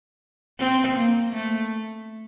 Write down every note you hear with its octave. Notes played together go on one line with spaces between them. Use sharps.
C4
A#3
A3